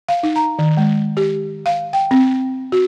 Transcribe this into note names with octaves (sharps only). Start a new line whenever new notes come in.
F5
D#4
A#5
D#3
G#3
G4
F5
G5
C4
F#4